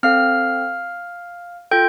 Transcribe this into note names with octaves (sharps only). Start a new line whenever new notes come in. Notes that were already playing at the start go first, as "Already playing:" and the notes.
C4 A4 F5 F6
F4 A4 G5 G6